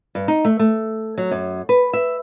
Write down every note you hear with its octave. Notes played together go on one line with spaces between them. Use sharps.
G2
D#4
A3
A3
F#3
F#2
B4
E5